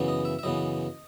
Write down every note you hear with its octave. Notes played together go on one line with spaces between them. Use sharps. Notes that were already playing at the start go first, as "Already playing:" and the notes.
Already playing: F#2 C#3 E3 B3
D#5
E5
E5
F#2 C#3 E3 B3 D#5